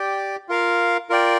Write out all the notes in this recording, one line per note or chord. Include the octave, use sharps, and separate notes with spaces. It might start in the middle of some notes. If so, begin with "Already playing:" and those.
Already playing: G4 D5 G5
F4 A#4 F5
F4 A#4 D5 G5